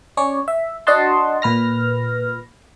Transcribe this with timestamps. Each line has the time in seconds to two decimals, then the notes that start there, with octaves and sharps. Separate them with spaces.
0.17 C#4 C#5 D5
0.48 E5
0.87 D4 F#4 D#5 F#5 A5 C6
1.42 A#2 B4 F6 A#6